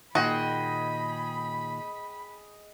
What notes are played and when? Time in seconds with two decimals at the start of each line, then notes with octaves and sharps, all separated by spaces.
0.15 A#2 D#3 F#4 G#4 D#5 G5 B5